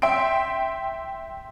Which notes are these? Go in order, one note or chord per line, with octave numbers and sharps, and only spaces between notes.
E5 G5 C6 D7